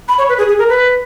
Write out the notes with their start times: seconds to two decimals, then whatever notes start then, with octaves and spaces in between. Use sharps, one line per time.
0.08 B5
0.18 C#5
0.29 B4
0.38 G#4
0.48 G#4
0.59 A#4
0.69 B4